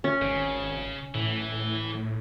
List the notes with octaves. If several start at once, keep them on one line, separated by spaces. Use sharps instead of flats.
C#4
G#1 C#3
A2 E3